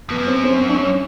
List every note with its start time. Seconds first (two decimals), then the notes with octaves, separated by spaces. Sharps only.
0.09 F2 B3
0.18 F#2
0.27 C4
0.44 C4
0.60 C4
0.69 D4
0.77 C#4